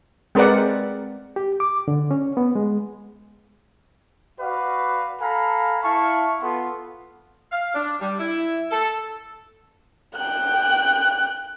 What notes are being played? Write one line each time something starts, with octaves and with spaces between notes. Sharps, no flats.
G#3 C4 A#4 B4 D5 F#5
G4
D6
D3
C#4
B3
G#3
F#4 B4 D5 F5
A4 F5 G#5 A#5 B5
E4 F5 A5 C#6
B3 F4 A4 C6
F5
D4
G3
E4
A4
G5 F#6